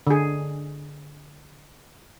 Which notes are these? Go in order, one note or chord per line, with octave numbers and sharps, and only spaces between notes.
D3 G#4